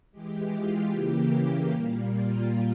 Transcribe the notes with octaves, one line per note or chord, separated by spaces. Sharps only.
E3 G#3 G4
F4
C#3 E3 A#3 G4
A#2 G3 A#3
F4